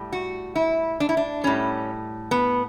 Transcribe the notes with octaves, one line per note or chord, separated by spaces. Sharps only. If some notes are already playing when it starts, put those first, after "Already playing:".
Already playing: A2 G3
F#4
E4
D4
E4
D4
A2 G3 C#4
B3